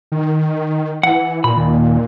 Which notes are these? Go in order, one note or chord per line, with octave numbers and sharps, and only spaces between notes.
D#3
E3 F#5
A#2 B5
D#2